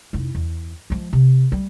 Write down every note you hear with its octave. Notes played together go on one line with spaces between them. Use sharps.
F1 E4
E2
F3 G#3
C3
G3 A3